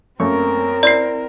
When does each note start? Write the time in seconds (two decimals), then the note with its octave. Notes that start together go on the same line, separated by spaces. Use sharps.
0.20 F#2 A3 A#3 C4 A#4 C#6
0.83 E4 C5 D5 C7